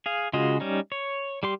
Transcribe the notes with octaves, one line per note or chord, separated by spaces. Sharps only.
G#4 F5
C#3 G#3 F4 F#4 D#5
G3 C#4 D#4
C#5
G3 G4 C6